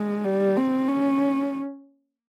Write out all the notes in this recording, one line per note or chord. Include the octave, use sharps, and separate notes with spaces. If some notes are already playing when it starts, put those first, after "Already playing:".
Already playing: G#3
G3
C4
C#4